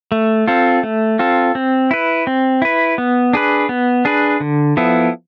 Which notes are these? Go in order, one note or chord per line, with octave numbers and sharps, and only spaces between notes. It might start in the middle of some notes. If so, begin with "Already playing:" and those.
A3
C4 F4 A4
A3
C4 F4 A4
C4
E4 B4
C4
E4 B4
B3
D4 G#4 B4
B3
D4 G#4 B4
D3
F3 B3 E4 A4